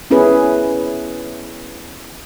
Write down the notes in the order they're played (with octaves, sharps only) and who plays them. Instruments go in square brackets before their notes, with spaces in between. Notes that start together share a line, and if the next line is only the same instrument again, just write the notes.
[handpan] B3 C#4 E4 G#4 B4